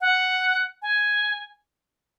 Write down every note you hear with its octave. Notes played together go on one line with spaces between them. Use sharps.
F#5
G#5